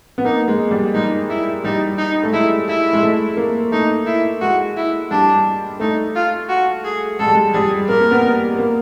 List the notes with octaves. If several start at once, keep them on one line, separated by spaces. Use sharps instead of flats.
B3
A#3 D#4
G#3
G3
G#3 D#4
E4
G3 D#4
D#4
A3
G#3 E4
E4
G#3
A3
A#3
A3 D#4
E4
G#3 F#4
E4
G3 D4
A3 D#4
F4
F#4
G#4
G#3 A4
G3
G#3
G3 G#4
A#3 A#4
A#3
B3
A#3